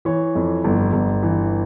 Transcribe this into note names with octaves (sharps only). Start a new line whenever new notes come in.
E3 C#5
F2
G1
G1
E3